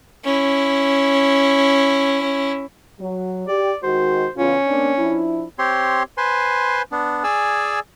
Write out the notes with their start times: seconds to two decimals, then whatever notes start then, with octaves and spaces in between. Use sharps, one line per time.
0.24 C#4 E4
3.00 F#3
3.48 G4 D5
3.83 D#3 G#3 F#4 C5
4.37 E2 C#3 C#4 F4
4.68 A#3 C4 D4
4.98 F3 D4 E4
5.59 C4 G4 C#5 C6
6.17 B4 C5 G#5 C6
6.92 B3 D4
7.24 G#4 D5 G#5 E6